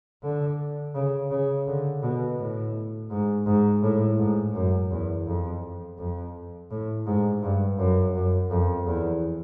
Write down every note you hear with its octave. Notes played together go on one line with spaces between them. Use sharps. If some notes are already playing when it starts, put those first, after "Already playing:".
D3
C#3
C#3
D3
B2
A2
G#2
G#2
A2
G#2
F#2
E2
F2
F2
A2
G#2
G2
F#2
F#2
F2
E2